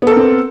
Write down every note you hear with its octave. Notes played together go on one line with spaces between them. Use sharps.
B3 C4 A4 A#4